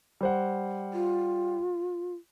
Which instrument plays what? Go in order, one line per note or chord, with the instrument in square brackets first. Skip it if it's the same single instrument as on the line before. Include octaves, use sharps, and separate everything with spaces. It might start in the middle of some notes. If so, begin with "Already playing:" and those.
[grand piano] G3 C5 F#5
[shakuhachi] F4